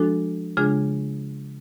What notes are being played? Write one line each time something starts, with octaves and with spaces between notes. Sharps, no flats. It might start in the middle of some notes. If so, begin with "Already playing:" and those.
Already playing: F3 G#3 D4 F#4 A4
C#3 G#3 D4 F4 G#4